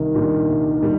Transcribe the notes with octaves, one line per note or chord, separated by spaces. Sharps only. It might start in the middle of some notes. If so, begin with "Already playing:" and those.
Already playing: C2 D#3
A#2 G3 D4 G4
C2
A#2 G3